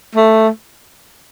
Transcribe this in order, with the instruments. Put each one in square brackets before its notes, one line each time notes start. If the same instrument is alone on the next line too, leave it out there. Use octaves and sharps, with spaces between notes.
[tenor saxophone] A3